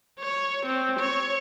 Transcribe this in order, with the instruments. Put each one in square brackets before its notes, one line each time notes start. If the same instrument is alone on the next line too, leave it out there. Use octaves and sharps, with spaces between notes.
[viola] C#5
C4
C#5